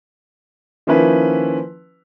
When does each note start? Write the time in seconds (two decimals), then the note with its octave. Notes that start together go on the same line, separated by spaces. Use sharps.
0.87 D#3 F3 A#3 C#4 E4 B4